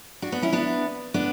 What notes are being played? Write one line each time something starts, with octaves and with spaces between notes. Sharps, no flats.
D4 F#4
B3 D4
C#4 E4
B3 D4
B3 D4